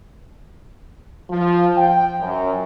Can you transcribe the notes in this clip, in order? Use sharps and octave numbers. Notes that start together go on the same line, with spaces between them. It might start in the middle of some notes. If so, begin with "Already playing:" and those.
F3
G5
F#2